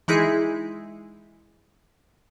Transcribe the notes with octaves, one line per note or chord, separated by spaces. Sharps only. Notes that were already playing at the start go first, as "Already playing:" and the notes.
E3 G#3 D#4 E4 G#4